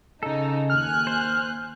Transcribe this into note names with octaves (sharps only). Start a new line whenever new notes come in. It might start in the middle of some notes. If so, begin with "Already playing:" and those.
C#3 D#4 A4
D#2 G#5 F6 F#6
C5